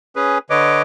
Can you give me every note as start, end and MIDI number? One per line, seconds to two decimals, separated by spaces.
0.16 0.38 61
0.16 0.38 68
0.16 0.38 71
0.50 0.82 50
0.50 0.82 71
0.50 0.82 73
0.50 0.82 75
0.50 0.82 86